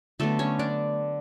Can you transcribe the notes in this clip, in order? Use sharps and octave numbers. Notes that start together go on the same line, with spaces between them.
D3 F#3 A3 B3 A4
C#4 C#5
D4 D5